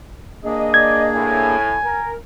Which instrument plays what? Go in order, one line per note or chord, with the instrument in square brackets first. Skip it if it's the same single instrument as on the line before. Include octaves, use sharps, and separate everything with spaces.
[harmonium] A#3 D4 G#4 [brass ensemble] D#5
[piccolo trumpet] D5 [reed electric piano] G#6
[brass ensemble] A2 [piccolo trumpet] G#5
[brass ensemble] A#4